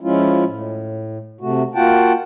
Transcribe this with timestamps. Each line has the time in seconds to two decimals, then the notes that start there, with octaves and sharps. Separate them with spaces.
0.01 F3 G#3 C#4 E4 F4
0.44 A2
1.41 C3 A3 F#4
1.75 A#3 F4 F#4 F#5 G5 A5